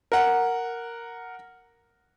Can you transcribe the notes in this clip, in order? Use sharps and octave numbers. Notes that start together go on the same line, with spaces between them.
A#4 F#5